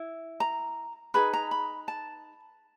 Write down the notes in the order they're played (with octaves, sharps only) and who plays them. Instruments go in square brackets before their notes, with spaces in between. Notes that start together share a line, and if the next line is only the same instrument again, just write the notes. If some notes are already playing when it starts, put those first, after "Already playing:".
Already playing: [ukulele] E4
A#5
D#4 G#4 B4 B5
A#5
B5
A5